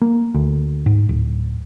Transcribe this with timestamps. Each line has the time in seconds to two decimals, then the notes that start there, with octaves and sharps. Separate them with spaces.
0.02 A#3
0.34 D2
0.86 G#2
1.09 D1